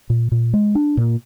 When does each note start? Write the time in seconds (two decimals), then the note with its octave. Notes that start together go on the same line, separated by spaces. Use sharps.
0.10 A#2
0.32 A#2
0.53 G#3
0.75 D4
0.97 A#2